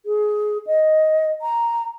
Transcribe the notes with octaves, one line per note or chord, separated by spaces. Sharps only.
G#4
D#5
A#5